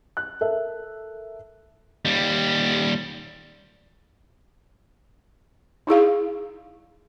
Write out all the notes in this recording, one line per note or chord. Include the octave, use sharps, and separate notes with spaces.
F#6
A4 A#4 E5
D#2 G3
D#4 E4 G#4 F5